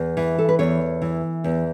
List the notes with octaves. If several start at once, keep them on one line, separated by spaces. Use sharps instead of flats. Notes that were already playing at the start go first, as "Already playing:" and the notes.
Already playing: E2
E3
A4
B4
E2 C#5
E3
E2